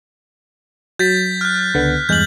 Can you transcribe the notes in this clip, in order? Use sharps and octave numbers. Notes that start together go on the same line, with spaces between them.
F#3 G6 A6 B6
F6 F#6
C#2 D3 B3
E2 G2 G#3 G6 F#7